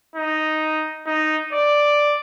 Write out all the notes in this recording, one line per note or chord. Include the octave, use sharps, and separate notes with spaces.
D#4
D#4
D5